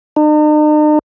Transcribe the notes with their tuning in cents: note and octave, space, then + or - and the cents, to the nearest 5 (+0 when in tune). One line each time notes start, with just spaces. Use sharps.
D#4 -45